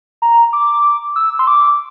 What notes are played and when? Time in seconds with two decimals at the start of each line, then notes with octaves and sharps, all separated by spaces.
0.22 A#5
0.53 D6
1.16 E6
1.39 C6
1.47 D6